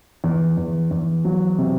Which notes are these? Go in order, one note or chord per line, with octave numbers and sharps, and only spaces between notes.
E2
E2
E2
F#3
C3